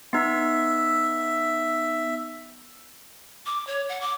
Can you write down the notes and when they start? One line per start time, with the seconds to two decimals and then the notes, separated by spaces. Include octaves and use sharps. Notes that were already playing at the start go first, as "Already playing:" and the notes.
0.13 B3 D#4 E5
3.46 D6
3.67 C#5
3.89 F#5
4.01 D6